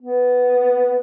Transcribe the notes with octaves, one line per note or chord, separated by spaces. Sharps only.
B3